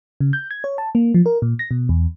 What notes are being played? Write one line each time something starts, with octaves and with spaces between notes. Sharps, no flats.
C#3
G6
G#6
C#5
A5
A#3
F3
A#4
A#2
A#6
B2
E2